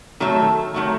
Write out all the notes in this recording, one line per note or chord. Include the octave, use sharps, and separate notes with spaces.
D#3 F#3 A3 A4
D#3 F#3 A3